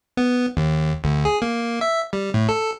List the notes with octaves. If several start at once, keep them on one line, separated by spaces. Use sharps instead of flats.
B3
D#2
D2
G#4
A#3
E5
G3
A2
A4